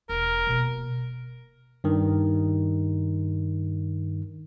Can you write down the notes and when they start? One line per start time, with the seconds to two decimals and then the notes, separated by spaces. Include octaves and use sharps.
0.09 E1 A#4
0.47 B2 A#3
1.84 G2 D#3